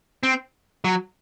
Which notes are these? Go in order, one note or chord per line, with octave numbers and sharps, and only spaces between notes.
C4
F#3